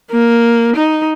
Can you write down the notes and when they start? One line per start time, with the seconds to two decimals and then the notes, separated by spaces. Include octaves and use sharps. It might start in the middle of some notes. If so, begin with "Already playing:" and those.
0.11 A#3
0.76 D#4